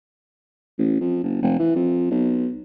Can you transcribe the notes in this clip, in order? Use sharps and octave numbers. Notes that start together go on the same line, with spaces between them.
A1
F2
F#1
F1
E3
F2
B1